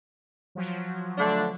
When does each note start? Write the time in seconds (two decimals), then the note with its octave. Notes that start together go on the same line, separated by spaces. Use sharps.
0.55 F3 F#3
1.17 D3 A3 D4